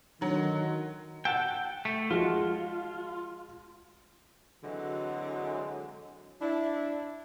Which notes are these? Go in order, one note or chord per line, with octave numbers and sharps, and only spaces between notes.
D3 D#3 F#3
F#5 G5 A5 E6
A3
F3 G#3 F4 F#4
D3 E3 F#3 G#3 C4 F#4
D4 E4